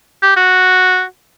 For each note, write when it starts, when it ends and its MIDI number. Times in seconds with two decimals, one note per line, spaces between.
0.22 0.32 67
0.36 1.03 66